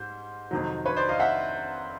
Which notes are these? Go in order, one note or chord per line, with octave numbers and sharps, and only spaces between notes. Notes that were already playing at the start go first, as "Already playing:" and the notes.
Already playing: G#2 G3 C5
F2 C3 D#3 F#3
B4 C#5
C5 D5
D#5 F5
E5 F#5